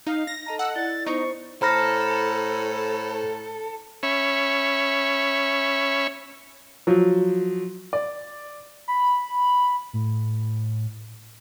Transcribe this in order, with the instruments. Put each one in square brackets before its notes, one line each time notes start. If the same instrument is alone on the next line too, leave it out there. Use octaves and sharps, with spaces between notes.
[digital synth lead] D#4 [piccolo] F5
[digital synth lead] A#6
[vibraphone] A4 D#5 A5 [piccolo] A#5
[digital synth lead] F#5 [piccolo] E6
[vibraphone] E4 D5 [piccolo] A6
[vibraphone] B3 C5 [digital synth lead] D#4 [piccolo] C#6
[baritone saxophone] A2 [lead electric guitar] A4 [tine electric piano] C5 B5 [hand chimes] A#5 F6 A#6
[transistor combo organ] C#4 C#5 E5 B5
[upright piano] F3 F#3
D5
[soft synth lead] B5
A2